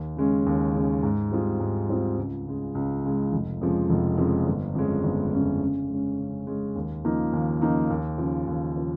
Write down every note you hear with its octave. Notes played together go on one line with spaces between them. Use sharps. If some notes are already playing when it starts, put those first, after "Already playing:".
Already playing: D#2
C#3 G#3 C#4
D#2
C#3 G#3 C#4
G#2
G3 C4 F4 G#4
G#2
G3 C4 F4 G#4
C#2
C#3 G#3
C#2
C#3 G#3
F1
F2 C#3 F3 G#3
F1
F2 C#3 F3 G#3
G1
F2 C#3 G#3 C#4
G1
F2 C#3 G#3 C#4
C#3
G#3 C#4
C#3
G#3 C#4
D#2
C#3 F3 A#3 D#4
D#2
C#3 F3 A#3 D#4
D#2
C#3 F3
D#2
C#3 F3